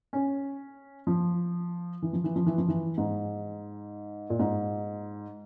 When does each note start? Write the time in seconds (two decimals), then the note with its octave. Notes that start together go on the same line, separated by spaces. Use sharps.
0.13 C#4
1.07 F3
2.02 E3
2.13 F3
2.24 E3
2.36 F3
2.46 E3
2.58 F3
2.68 E3
2.97 G#2
4.30 A#2
4.39 G#2